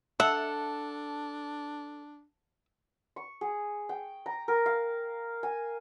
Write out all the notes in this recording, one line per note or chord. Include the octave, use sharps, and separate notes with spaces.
D4 A4 E5 F#5
C#6
G#4
G5
A#5
A#4
F5
G#5